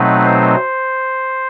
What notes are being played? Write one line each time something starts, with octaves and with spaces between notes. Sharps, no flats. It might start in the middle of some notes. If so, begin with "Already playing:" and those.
Already playing: B2 F#3 A3 C4 D#4 B4
C5